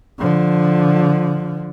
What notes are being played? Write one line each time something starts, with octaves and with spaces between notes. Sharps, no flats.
D3 F3